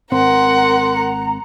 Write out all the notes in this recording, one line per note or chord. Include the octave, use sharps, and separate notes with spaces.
G#1 C4 A#4 F#5 C6
A#5